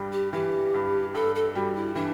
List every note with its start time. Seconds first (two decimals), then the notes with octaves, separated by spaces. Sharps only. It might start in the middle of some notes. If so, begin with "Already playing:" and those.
Already playing: G2 G3
0.12 G4
0.33 E3 G4
0.74 G2
1.14 G2 A4
1.35 A4
1.55 G3 F#4
1.75 E4
1.95 E3 D4